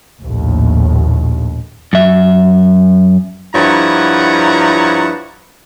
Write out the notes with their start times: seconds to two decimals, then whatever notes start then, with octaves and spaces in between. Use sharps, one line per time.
0.22 A#1 D#2 A2
1.93 F#2 E5
3.55 G2 F3 E4 C#5 F#5 A#5